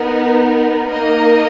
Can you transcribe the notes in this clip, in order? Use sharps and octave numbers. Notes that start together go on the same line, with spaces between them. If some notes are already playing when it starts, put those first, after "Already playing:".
Already playing: B3 D#4 A#4
A#3 D#4 A#4 D#5